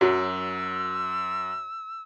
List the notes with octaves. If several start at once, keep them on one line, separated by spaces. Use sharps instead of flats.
F#2 F#3 E6